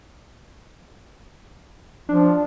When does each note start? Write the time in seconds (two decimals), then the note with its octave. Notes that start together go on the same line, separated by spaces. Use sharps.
2.09 F3 D4